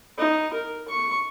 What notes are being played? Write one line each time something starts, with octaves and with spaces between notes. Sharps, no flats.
D#4
A#4
C#6